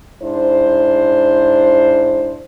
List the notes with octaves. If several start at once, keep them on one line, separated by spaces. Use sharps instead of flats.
G#2 D4 E4 C5